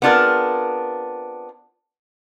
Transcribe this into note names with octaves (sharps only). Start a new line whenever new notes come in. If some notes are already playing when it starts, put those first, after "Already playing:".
B3 C4 D4 F4 G#4 A#4